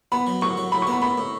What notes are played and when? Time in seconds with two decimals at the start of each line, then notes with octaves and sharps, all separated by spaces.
0.12 B3 B5
0.27 F#3
0.42 A2 C#6
0.57 F#3
0.72 A2 B5
0.82 C#6
0.87 B3 B5
1.02 A2 B5
1.18 A2